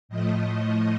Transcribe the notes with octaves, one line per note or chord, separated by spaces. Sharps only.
A2 F3 A3 D#5